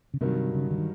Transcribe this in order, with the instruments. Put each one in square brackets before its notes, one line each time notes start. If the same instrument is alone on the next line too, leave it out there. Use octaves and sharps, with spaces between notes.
[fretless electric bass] C#3
[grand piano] G2 D#3 F#3 [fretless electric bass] C3
[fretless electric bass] C#3
D3
D#3